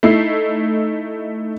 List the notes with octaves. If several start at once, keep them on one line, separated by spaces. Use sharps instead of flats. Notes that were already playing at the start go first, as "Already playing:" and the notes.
A3 D#4 E4 C7